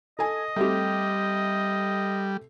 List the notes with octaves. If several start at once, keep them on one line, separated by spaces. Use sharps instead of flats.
A4 D#5 G#5
G3 A3 C4 G4